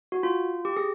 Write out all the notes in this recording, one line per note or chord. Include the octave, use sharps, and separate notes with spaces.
F#4
F4
G4
G#4